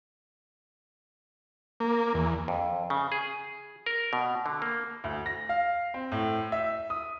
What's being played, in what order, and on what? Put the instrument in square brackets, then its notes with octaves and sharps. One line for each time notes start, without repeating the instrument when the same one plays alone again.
[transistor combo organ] A#3
E2
[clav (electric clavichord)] F2
C#3
G#4
A#4
B2
D3
A#3
[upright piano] D2
A#6
F5
C4
A2
E5
D#6